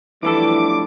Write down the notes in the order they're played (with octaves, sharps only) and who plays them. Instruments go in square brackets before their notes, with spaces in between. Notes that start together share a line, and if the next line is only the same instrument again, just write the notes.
[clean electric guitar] B1 A2 A4 [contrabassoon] E3 [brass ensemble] F3 G3 D4 [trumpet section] D6